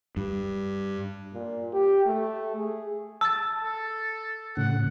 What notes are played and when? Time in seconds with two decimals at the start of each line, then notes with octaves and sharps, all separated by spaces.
0.17 G2
1.33 A#2
1.73 G4
2.06 A3
2.57 G#4
3.21 A5 E6 A6
3.61 A4
4.57 A2 C#3 F#5